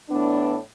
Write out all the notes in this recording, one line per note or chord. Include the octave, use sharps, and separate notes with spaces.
A2 E3 B3 D4